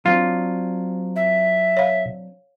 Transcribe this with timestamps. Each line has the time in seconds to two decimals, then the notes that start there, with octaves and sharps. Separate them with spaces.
0.06 F#3 C4 D4 F4
1.16 E5
1.77 C#5 F5